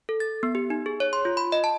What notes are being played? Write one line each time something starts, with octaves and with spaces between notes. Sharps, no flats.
A4
A6
B3
G4
D#4
G#4
C#5
C6
F4
B5
D#5
A5